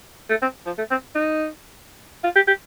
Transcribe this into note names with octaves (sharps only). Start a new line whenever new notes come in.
A3
C4
F3
A3
C4
D#4
F4
G4
G4